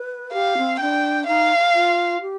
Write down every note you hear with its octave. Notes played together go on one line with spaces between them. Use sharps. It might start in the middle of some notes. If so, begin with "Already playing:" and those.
Already playing: B4
G4 F5
C4
D4 G5
D#4 F5
F4
G4